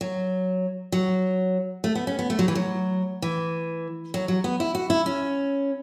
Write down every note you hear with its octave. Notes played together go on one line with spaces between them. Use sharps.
F#3
F#3
A3
B3
C#4
B3
A3
F#3
E3
F#3
E3
F#3
F#3
B3
E4
F#4
E4
C#4